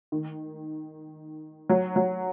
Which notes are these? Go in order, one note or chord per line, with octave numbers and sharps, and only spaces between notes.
D#3
F#3
F#3